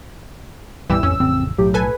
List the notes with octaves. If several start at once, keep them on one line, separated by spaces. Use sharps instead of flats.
C2 G2 B2 E3 G3 G4 E6
A1 F2 C#4
A1 F2 C#3 C4
B1 A2 F#3 G4
A4 B4 G#5